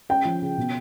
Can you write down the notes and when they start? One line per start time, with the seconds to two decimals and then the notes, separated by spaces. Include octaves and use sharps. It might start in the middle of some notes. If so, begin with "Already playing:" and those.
0.09 C#4 G5
0.25 F3
0.42 C#3
0.57 B2